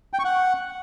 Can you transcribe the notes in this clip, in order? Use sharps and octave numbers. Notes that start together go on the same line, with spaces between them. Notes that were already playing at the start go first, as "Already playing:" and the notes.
G5
C#6
F#5